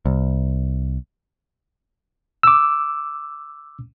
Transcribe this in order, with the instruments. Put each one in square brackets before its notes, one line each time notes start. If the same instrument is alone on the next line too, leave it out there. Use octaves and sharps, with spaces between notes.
[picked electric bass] C2
[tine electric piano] D6 E6